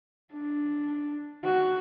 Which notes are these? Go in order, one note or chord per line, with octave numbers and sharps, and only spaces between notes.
D4
F#4